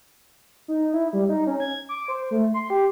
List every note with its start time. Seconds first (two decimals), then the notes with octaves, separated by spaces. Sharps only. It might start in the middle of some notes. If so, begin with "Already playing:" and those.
0.68 D#4
0.94 E4
1.13 G3
1.29 D#4
1.47 C#4
1.60 G#6
1.89 D6
2.08 C5
2.31 A3
2.54 C6
2.70 G4